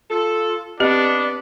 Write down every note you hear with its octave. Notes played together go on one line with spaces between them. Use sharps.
F4 A4
B3 C4 D4 G4 D5 D#5